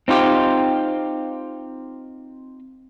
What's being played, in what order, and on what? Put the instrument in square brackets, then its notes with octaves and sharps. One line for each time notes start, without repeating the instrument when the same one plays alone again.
[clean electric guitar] C4 D#4 F4 G4